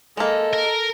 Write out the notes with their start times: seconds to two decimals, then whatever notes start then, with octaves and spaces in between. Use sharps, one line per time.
0.17 G#3 A#3 A4 D#5
0.53 A#4